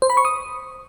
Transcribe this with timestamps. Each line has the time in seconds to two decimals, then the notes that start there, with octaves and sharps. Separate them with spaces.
0.02 C5
0.10 B5
0.17 C#6
0.25 D#6